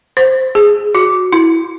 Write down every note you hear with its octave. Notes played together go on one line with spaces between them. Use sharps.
C5
G#4
F#4
E4